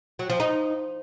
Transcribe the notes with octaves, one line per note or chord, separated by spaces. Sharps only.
F#3
F3
D#4